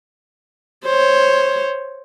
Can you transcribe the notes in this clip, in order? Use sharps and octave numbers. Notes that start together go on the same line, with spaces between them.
C5 C#5